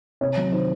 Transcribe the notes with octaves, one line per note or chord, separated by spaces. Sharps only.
C3 C#5
F#3
D#3 C5